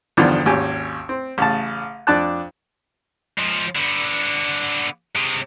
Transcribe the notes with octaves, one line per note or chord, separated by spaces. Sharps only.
E2 G2 D3 D#3 F3
G#1 D#2 C#4 G4 G#5
C4
A1 C#3 A5
F2 D4 D5 A5 F#6
G#2 F3
D3 B3
C3 G#3